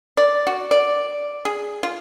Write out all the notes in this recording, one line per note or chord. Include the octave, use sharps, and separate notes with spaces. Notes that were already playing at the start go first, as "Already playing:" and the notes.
D5
F#4
D5
G#4
F4